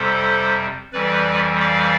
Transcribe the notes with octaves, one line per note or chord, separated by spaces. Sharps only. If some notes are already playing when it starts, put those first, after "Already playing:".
Already playing: F2 C3 G3 A4 C5
F2 E3 G3 B4 D5
D5 F5